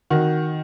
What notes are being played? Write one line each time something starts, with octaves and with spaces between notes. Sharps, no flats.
D#3 F#4